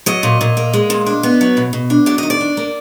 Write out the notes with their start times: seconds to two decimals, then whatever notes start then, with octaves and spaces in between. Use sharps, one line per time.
0.06 F#3 D#5
0.23 A#2
0.41 A#2
0.57 A#3
0.73 G#3
0.90 A#2
1.06 D4
1.23 B3
1.41 F#3
1.57 B2
1.73 B2
1.90 D4
2.06 F#3 D5
2.18 D#3 D#5
2.30 D5
2.41 D4
2.57 A#3